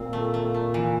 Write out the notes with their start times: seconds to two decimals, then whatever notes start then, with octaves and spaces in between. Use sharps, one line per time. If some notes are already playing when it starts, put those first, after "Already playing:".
Already playing: A#2 C4
0.13 A3
0.34 A3
0.54 A3
0.74 E3